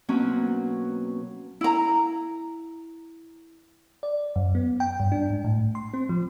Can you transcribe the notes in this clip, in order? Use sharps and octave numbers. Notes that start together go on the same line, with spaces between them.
B2 F#3 A#3 C4 C#4
E4 A#5
D5
F#2
B3
G5
G2
D4
G#2
A2
C6
C4
F3